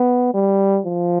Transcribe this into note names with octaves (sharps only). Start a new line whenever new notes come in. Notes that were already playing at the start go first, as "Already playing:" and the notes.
Already playing: B3
G3
F3